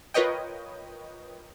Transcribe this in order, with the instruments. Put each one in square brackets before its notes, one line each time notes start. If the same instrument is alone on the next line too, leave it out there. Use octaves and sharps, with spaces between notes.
[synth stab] F4 A#4 B4 C#5 D#5 G5